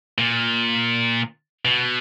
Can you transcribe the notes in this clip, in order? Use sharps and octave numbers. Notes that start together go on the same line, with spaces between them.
A#2
B2